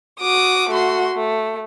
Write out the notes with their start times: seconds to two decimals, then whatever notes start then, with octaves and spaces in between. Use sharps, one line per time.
0.21 F#4 D6 D#6
0.69 A3 F#4 C6
1.14 A3